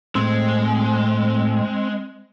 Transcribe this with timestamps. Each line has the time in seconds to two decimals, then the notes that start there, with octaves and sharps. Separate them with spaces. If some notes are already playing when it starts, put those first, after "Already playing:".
0.15 A2 G#3 C4